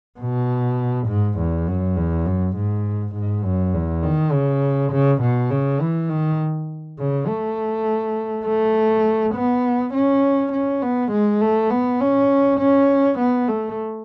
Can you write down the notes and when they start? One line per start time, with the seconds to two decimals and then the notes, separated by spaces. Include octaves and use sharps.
0.19 B2
1.07 G#2
1.38 E2
1.67 F#2
1.97 E2
2.26 F#2
2.56 G#2
3.14 G#2
3.44 F#2
3.74 E2
4.03 D#3
4.33 C#3
4.92 C#3
5.22 B2
5.51 C#3
5.80 E3
6.09 D#3
6.99 C#3
7.27 A3
8.46 A3
9.34 B3
9.93 C#4
10.52 C#4
10.82 B3
11.11 G#3
11.41 A3
11.70 B3
12.00 C#4
12.59 C#4
13.18 B3
13.48 A3